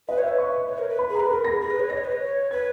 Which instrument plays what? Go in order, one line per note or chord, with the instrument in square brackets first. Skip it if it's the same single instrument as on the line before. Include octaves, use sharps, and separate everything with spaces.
[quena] B4 [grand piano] D#5
[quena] C#5 [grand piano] E5
[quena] B4
[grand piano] C#6
[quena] C#5
A#4
B4
[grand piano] B5
[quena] G#4
[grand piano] A#5
[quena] B4
[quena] A#4 [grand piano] B5
[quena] G#4 [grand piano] A#6
[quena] G#4
B4
C#5
[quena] D#5 [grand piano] A#6
[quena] C#5
B4
C#5
[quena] B4 [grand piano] G#6